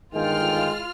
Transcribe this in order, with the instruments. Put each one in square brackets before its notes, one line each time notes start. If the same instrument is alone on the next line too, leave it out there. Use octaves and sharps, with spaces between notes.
[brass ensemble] G1 D#3 G5 [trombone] G#3 [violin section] F4 F6